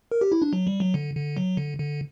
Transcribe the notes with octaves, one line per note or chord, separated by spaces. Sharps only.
A#4
G4
E4
D4
F#3
G3
F#3
D3
D3
F#3
D3
D3